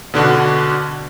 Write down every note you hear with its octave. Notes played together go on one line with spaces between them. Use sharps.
B2 D3 D4 F#4